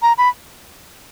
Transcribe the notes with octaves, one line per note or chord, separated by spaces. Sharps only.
A#5
B5